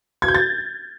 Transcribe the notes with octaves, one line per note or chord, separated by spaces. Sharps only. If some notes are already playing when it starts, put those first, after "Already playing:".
G#6
G6
A6